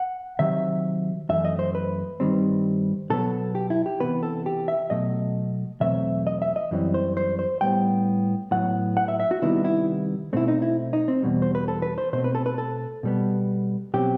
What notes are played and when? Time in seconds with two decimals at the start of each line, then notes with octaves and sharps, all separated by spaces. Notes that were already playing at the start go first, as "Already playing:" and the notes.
Already playing: F#5
0.39 C3 D#3 F#3 E5
1.29 F#2 E3 A3 E5
1.45 D#5
1.59 C5
1.75 B4
2.20 G2 D#3 G3 C4
3.10 B2 F#3 B3 A4
3.55 G4
3.70 E4
3.86 G4
4.00 C3 E3 B3 B4
4.23 A4
4.46 G4
4.68 E5
4.90 B2 F#3 A3 D#5
5.80 E2 B2 F#3 A3 C4 E5
6.27 D#5
6.42 E5
6.56 D#5
6.71 F#2 E3 G3 C4
6.94 C5
7.17 C5
7.39 C5
7.61 A2 G3 B3 G5
8.51 A2 F#3 B3 F#5
8.97 F#5
9.08 E5
9.20 E5
9.31 F#4
9.42 C3 D#3 G3 B3 E4
9.65 E4
10.33 B2 A3 C4 E4
10.48 D#4
10.62 E4
10.93 D#4
11.08 C4
11.23 E2 B2 G3
11.42 C5
11.55 B4
11.68 A4
11.82 B4
11.98 C5
12.13 B2 A3 C4 C5
12.24 B4
12.35 A4
12.46 B4
12.58 A4
13.03 B2 G3 B3
13.94 B2 F#3 C4 G4